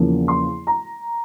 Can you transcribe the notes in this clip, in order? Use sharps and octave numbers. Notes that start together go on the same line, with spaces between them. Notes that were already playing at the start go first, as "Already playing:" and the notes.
Already playing: E2 C#3 F3 A#3
C6
A#5